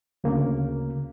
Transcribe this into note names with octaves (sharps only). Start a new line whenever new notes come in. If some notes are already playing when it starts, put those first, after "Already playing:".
D2 C#3 A#3